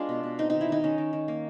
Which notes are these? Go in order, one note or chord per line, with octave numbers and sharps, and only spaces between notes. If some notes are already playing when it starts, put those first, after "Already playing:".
Already playing: G#3 B3 D4 F4
B2
B2
C4 D#4
D#3 D#4
E4
D#3 D#4
D#3 C#4
D#3
D#3
A#3